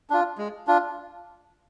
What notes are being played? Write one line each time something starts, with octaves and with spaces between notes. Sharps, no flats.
D4 F4
G#3
D4 F4